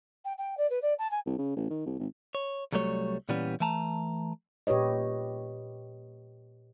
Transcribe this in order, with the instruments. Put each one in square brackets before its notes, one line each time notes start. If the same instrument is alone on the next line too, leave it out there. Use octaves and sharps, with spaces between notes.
[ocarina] G5
G5
D5
B4
D5
A5
G#5
[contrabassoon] C2
C#3
A1
D#3
C2
G#1
[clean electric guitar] C#5
C2 F#3 G3 A3 C#5
A#2 E3 G3 B3 C#4
E3 A3 A5 A#5
[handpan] A#2 G4 B4 C#5 D#5